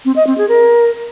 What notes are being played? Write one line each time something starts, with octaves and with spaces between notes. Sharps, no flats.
C4
D#5
C4
G#4
A#4